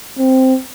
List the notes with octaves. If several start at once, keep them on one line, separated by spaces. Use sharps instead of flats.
C4